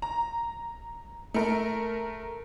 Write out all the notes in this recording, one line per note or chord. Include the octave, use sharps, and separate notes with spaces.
A#5
A3 A#4